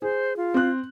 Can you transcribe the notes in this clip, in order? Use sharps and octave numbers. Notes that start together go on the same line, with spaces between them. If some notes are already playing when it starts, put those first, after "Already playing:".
G#4 C5
F4
C4 F#6